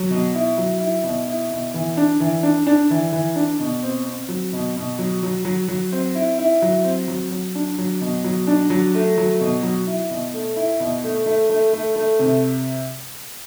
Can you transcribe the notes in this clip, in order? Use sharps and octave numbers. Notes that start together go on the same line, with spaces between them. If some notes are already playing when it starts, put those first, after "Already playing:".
Already playing: F#3
B2
E4
F#3
E4
B2
E4
B2
E3
D4
E3
D4
D4
E3
E3
D4
B2
C4
C4
F#3
B2
B2
F#3
F#3
F#3
F#3
C4
E4
E4
F#3
C4
F#3
F#3
D4
F#3
B2
F#3
D4
F#3
A3
F#3
B2
F#3
E4
B2
A3
E4
B2
A3
A3
A3
A3
A3
C3